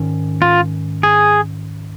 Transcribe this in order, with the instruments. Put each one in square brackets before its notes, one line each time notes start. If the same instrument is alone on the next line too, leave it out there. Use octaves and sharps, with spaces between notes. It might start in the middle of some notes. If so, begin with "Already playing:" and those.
Already playing: [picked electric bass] G#2 D#3 C#4
[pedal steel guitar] F4
G#4